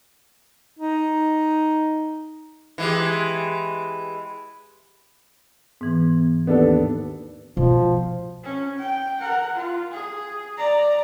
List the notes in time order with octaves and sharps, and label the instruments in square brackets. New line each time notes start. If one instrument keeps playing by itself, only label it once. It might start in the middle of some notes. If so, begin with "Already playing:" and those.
[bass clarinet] D#4
[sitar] E3 G#3 G4
[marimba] G#2 E3 [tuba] B3
[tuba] D#2 [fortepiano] B3 D4 A4
[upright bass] B2 [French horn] F3
[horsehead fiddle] C#4
G5
A#4 F#5
F4
G#4
D5 A#5